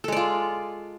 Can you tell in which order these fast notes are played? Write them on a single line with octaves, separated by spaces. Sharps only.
A4 G#3 D5 F4